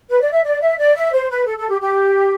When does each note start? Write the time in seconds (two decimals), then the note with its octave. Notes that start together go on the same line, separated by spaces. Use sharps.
0.09 B4
0.20 D5
0.32 E5
0.43 D5
0.60 E5
0.78 D5
0.95 E5
1.12 C5
1.29 B4
1.46 A4
1.57 A4
1.69 G4
1.80 G4